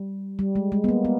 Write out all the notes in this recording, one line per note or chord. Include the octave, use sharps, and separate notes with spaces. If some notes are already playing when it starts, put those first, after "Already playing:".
Already playing: G3
G3
G#3
G#3
B3
A#3
B3